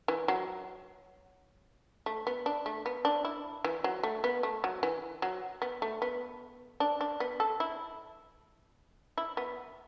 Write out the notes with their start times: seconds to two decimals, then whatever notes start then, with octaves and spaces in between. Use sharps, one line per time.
0.08 E3
0.28 F#3
2.06 A3
2.27 B3
2.46 D4
2.66 A3
2.86 B3
3.05 D4
3.25 E4
3.64 E3
3.84 F#3
4.03 A3
4.24 B3
4.43 A3
4.64 F#3
4.83 E3
5.22 F#3
5.62 B3
5.82 A3
6.02 B3
6.80 D4
7.01 D4
7.20 B3
7.40 A4
7.60 E4
9.18 E4
9.37 B3